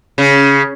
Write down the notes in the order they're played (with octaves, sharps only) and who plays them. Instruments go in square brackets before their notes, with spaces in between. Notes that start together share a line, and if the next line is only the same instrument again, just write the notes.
[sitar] C#3